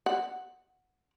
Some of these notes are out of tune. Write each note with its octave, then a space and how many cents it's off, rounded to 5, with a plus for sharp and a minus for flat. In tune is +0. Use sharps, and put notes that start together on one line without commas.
F#5 -5